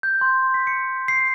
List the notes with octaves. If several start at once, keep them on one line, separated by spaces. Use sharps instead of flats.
G6
C6
B6
C#7
C7